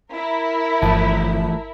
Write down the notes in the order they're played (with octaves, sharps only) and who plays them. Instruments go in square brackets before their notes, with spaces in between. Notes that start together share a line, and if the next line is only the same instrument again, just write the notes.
[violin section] E4 A#4
[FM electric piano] G1 A5 [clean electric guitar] E3 F3 A3